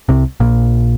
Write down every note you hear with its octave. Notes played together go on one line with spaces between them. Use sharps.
C2 C3
A#1 A#2